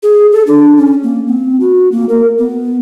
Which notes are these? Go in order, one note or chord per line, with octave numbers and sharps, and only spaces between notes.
G#4
A4
D4
C#4
A#3
C4
F#4
A#3
A#4
B3